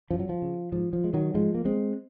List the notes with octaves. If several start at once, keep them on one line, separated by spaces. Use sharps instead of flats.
F#2 F3
F#3
F3
C#3
G#2 F3
F3
G#3
D#3 F#3
G#2 F3 G#3
A#3
G#3 C4